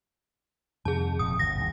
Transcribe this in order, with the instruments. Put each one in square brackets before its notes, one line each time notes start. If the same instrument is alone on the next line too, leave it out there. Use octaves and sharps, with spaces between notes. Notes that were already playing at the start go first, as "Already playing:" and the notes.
[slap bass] F2 C3 D#3 [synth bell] G#4 A5
[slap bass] D#1 F2 C3 [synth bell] D#6
[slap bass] G1 D2 B2 [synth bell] A#6
[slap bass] G1 E2 D#3